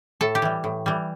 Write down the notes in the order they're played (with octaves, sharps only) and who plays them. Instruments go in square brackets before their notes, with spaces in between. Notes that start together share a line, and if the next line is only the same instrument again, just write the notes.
[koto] A2 A4
G4
E3 G3
A2
E3 G3